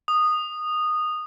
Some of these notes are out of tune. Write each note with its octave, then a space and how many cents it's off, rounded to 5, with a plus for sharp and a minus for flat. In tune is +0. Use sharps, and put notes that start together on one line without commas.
D#6 -15